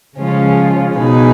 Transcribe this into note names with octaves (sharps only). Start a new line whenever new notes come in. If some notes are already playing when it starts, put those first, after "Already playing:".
C#3 F3 G#3 C#4 F4
B2 G#3 D#4 G#4 B4